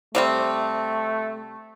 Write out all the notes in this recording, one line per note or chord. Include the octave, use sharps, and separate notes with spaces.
C3 G3 A3 C4